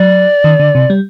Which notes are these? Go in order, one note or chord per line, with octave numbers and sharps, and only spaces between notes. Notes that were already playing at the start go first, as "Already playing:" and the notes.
Already playing: F#3 D5
D#3
D3
C3
G3